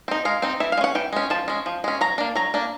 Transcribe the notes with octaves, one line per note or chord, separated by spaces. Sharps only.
C4 D#4
G#3 F5
C4 D#4
E3 E5
F5
G#3
C#4 F#5
E3 G5
G#3 C#4
F3 A5
G#3 C#4
F3
G#3 C#4
F#3 A#5
A#3 D4
F#3 A#5
A#3 D4